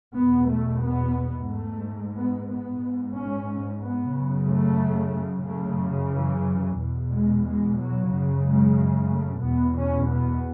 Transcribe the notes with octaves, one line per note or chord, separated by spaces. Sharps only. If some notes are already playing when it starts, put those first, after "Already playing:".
E2 B2 B3
A3
B3
G#2 A3
B3
B3
G#2
C#4
B3
F#2 C#3
A3
F#2 C#3 A3
E3
E2 B2
G#3
G#3
F#3
F#2 C#3
G#3
A3
E2 B2 B3
C#4
B3